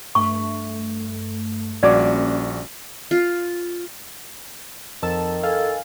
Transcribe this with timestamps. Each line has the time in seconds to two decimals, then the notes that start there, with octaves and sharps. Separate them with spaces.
0.15 G2 A3 C#6
1.83 A#1 G3 A#3 C#4 F#4 D5 D6
3.11 F4
5.03 F2 D#3 A5 E6
5.43 A4 F5 G#5